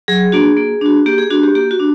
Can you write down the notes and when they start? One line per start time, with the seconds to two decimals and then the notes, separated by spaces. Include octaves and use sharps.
0.08 F#3 G#4
0.32 A#3 D4 F#4
0.56 A#3
0.81 D4 F#4
1.06 A#3 G4
1.18 G#4
1.30 D4 F#4
1.43 G4
1.55 A#3 G4
1.71 F#4
1.80 D4